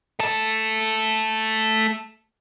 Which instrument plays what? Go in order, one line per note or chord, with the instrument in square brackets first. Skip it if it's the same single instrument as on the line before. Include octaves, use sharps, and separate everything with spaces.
[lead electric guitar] A3 A4